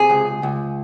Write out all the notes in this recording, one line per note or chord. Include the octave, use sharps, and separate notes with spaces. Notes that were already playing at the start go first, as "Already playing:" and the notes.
Already playing: C3 G#4
C#2
C#2